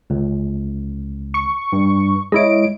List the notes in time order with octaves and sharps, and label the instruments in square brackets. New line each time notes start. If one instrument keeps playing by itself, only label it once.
[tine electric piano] C#2
[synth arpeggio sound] C#6
[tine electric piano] G2
[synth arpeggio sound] G#3 E4 D7 [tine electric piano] C#5 D#5